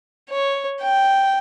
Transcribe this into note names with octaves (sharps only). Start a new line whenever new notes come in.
C#5
G5